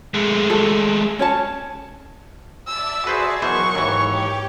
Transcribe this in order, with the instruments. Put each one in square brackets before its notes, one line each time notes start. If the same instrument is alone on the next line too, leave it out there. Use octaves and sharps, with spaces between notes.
[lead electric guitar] G#3 A3
[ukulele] A4
C#4 C#5 A5
[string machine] D5 E5 A5 [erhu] E6
[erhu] F#4 [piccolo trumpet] G#4 [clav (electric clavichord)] B4 C5
[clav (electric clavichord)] B2 E3 C5 [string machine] F#3 A#4 F#5 [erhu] C#6
[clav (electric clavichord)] D#2 E3 [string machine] G#2 [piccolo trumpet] C#5
[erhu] G4 [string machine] G5